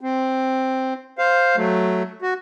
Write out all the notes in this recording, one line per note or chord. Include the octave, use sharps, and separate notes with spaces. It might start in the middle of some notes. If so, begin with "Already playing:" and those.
C4
C5 F5
F#3 A3
F#4